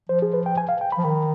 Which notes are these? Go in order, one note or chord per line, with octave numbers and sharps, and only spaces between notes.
F3 C5
G#4
B4
G5
G#5
F5
G5
B5
F3
D#3 B5